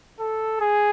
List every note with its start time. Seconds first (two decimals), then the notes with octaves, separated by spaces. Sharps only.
0.20 A4
0.60 G#4